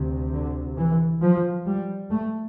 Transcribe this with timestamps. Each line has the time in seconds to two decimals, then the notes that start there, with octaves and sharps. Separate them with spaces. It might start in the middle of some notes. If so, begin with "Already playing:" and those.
Already playing: D2 C3
0.32 D3
0.76 E3
1.21 F3
1.66 G3
2.10 A3